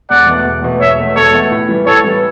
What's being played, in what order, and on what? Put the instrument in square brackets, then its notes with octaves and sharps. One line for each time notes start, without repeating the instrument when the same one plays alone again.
[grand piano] E1 [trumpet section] D5 F#5
[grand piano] E2 B2 A3
E1
E2 B2 A3
[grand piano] E1 [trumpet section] C#5 E5
[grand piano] E2 B2 A3
[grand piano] E1 [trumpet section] A4 C#5
[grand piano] E2 B2 A3
A2
E3 G3 B3
[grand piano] A2 [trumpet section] A4 C#5
[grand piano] E3 G3 B3